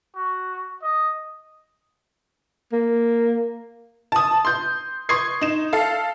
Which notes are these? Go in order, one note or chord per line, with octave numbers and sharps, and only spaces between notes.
F#4
D#5
A#3
A5 D#6
C6 G6
C6 C#6 D#6 G#6 C7
D#4 E7
A4 F5